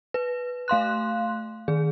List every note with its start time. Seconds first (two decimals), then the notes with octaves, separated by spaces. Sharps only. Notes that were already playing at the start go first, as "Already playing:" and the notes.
0.14 B4
0.68 A3 F5 C6 F#6
1.68 D#3 G#4